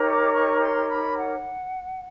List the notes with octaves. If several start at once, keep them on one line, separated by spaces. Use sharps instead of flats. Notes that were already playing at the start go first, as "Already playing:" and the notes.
Already playing: D#4 G4 A#4 C#5
D6
C#6
C6
B5
F#5